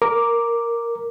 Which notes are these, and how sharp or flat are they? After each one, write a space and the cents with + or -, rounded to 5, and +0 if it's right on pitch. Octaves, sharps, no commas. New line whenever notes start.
A#4 +0 D6 +0